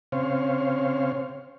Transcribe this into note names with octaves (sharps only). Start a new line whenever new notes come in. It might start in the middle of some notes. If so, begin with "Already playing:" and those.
C#3 C4 C5 C#5 F5